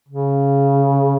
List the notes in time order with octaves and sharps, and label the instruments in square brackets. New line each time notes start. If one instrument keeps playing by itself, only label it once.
[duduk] C#3